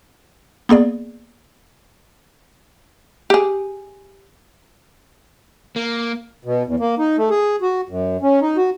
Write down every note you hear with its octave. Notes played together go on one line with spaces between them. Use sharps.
A#3 B3 G#4 D5
G4 G#4
A#3
B2
E2
A#3
D#4
A3
G#4
F#4
F#2
C#4
D#4
F#4